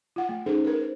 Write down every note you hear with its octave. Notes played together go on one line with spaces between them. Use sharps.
F4 F#5
A3
C#4 D#4 G#4 A4 C5
A#4 B4
C5